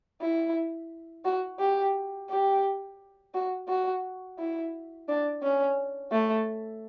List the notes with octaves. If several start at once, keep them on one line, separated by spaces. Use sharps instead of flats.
E4
F#4
G4
G4
F#4
F#4
E4
D4
C#4
A3